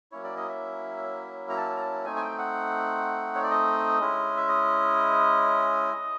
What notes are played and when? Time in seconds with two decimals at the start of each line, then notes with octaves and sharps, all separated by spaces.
0.12 F#3 A#3 C#4 E4 C#5
0.24 D5
0.36 D#5
0.49 E5
1.50 A#5
1.57 A5
1.76 A#5
1.81 A5
2.05 A3 C4 D#4 G#5
2.16 G#5
2.22 G5
2.38 F#5
3.35 C#5
3.43 D5
3.51 D#5
3.99 G#3 C#4 E4
4.37 E5
4.48 D#5